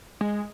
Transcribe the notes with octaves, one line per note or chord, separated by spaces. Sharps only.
G#3